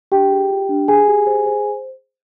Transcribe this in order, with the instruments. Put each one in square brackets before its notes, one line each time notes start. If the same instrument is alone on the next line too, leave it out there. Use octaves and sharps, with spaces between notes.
[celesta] D4 G4 G5
G#4
F4
D4
G4 G#4 G#5
G4
C5
C5